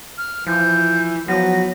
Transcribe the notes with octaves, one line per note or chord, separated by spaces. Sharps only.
F6
E3 F3 G6
F3 F#3 B3 A#6